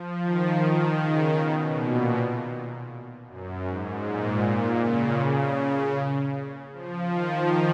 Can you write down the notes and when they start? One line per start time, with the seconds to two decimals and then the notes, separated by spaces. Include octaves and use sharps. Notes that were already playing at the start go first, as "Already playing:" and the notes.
Already playing: F3
0.23 D#3
0.99 C#3
1.38 B2
1.75 A#2
3.28 F#2
3.67 G#2
4.05 A#2
4.81 C#3
6.72 F3
7.11 D#3